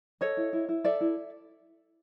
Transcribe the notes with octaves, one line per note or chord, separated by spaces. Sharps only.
A4 C#5 D#5
E4
E4
E4
A4 D5 E5
E4